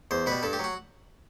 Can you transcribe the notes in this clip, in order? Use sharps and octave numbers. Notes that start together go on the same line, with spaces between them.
E2 C5
B2 G3 B4
G2 A4
G4
F#3
F#4